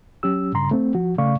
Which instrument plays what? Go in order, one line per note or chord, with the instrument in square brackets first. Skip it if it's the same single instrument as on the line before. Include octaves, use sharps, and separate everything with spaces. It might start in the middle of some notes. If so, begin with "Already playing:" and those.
[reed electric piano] F#3 C#4 G4 E6
G2 C#3 A#5 C6
A3 C4
F3 F#4
C#3 A3 D5 F5 C#6